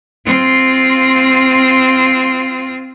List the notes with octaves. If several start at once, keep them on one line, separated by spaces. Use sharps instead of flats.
C4 F4